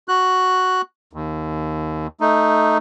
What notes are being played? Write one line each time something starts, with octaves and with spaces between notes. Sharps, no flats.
F#4 F#6
D#2
A3 D#4